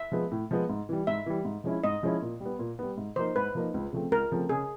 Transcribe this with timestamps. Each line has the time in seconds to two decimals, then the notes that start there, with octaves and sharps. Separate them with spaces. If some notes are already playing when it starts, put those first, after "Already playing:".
Already playing: E5
0.12 F3 G#3 B3
0.32 A2
0.51 F3 G#3 B3
0.69 G#2
0.89 E3 G3
1.07 G#2 E5
1.26 E3 G3
1.45 G#2
1.64 F3 G#3 C#4 E4
1.84 G#2 D#5
2.03 F3 G#3 C#4 E4
2.22 A#2
2.40 G3 B3
2.59 A#2
2.79 G3 B3
2.97 G#2
3.16 F3 A#3 D#4 C5
3.36 G#2 B4
3.55 F3 A#3 D#4
3.74 C#2
3.92 C#3 F3 A3 C4
4.11 C#2 A#4
4.31 C#3 F3 A3 C4
4.49 C#3 G#4